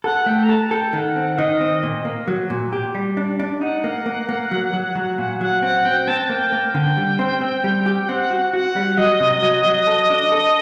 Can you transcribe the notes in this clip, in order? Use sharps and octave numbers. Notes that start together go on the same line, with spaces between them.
A4 F#5
A3 G5
A#5
A4 A5
A4 G5
D#3 F#5
C4
F#5
D#3 D#5
C4
A#2
A#3
F#3
A#2
G4
G3
D4
D4
D#4 F#5
A#3
A#3
A#3
F#3
F#3
F#3
A#2
F#3 F#5
C4 F#5
C4 G5
G5
C4 A5
A5
A#3 G5
A#3
D3 G5
G3
C4
C4
G3
G4
C4 F#5
F#4
F#4 F#5
G3
F#3 D#5
C3
F#3
F#3
A4
D4
A4